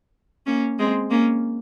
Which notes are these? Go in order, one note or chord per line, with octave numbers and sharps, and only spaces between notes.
A#3 C#4
G#3 C4
A#3 C#4